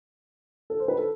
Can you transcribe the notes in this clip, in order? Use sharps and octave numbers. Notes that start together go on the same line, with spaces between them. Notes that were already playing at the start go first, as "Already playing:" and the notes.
A4
C5
B4
A4